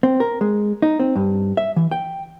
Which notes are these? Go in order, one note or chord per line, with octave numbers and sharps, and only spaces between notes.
C4
A#4
G#3
D#4
C4
G2
E5
E3
G5